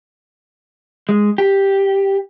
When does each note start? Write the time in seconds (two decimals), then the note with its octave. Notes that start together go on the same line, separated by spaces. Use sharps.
1.09 G#3
1.38 G4